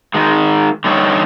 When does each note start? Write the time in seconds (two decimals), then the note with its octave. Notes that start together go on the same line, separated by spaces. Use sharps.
0.14 D#3 G#3
0.84 D3 G3 D#4 C#5